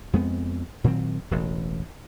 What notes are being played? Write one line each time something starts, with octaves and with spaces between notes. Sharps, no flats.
F2 G#3 B3 C4
A#2 D#3 F#3 C4
E1 A1